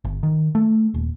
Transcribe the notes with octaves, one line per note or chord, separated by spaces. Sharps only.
G1
D#3
A3
D#1